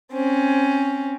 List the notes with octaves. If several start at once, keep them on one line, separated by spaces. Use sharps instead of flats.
C4 C#4